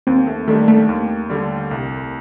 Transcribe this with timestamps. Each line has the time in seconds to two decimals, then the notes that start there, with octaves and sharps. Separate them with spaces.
0.07 D#2 C4
0.27 A3
0.47 D#3 G3 A3 D4
0.68 A3
0.89 D#2
1.30 D3 G3
1.71 C2